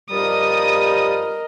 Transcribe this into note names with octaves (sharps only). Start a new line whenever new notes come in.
G2 F3 G3 A#4 D#5 D#6